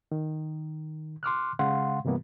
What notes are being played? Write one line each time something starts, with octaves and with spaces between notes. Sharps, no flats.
D#3
C6 D6 F6 F#6
C#3 G#3 F5 F#5 C6
G2 C3 E3 G3 A#3 B3